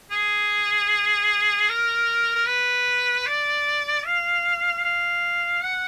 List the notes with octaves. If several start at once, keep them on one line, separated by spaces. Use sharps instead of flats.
G#4
A#4
A#4
B4
D5
F5
F5
F#5